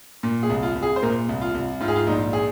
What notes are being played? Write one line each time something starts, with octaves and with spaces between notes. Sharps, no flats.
A#2
G#4
C2
F4
C2
G#4
C5
A#2 A#4
C2
F4
C2
G#2 F4
G#4
F4
A#1 D#4
G#4